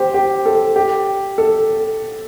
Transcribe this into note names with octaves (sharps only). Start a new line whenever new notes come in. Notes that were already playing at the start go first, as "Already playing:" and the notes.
Already playing: G4 C5
G4
A4
G4
A4